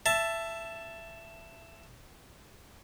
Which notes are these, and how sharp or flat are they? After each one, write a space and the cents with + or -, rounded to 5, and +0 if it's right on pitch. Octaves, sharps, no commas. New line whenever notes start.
E5 +15 A5 +0